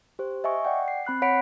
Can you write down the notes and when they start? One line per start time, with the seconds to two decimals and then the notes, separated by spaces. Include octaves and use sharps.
0.19 G4 C5
0.44 D#5 E5 G#5 C#6
0.65 D5 F#5 G5
0.88 C7
1.05 C4 B5 F#6 C7
1.22 C#5 F#5 B5 B6 C#7 D7